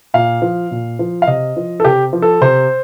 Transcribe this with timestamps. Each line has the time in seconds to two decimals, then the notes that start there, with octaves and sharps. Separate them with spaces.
0.14 A#2 F5
0.42 F3
0.71 A#2
0.99 F3
1.22 F5
1.27 C3 D#5
1.57 F3
1.80 A4
1.85 C3 G4
2.13 F3
2.22 A4
2.41 C3 C5